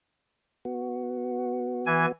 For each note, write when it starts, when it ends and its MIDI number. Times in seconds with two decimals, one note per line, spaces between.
0.65 2.12 59
0.65 2.12 66
1.86 2.06 52
1.86 2.06 80